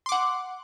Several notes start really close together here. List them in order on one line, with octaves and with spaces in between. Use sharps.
C6 D6 F#5